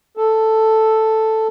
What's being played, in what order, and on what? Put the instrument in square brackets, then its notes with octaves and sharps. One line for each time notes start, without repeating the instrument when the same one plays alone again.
[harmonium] A4